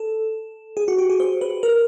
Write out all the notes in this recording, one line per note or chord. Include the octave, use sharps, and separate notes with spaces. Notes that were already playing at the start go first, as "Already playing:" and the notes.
Already playing: A4
G#4
F#4
G4
G#4
C5
B4
A#4